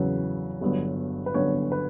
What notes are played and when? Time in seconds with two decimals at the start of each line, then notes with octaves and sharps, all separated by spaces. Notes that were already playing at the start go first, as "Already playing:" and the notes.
Already playing: E2 C#3 F#3 B4
0.61 G1 G2 F#3 B3
1.26 B4
1.34 G1 G2 F#3 B3 C#5
1.72 B4